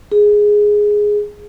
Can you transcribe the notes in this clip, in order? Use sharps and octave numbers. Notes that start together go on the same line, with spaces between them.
G#4